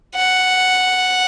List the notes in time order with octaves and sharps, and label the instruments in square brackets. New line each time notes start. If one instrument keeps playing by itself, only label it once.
[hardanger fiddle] F#5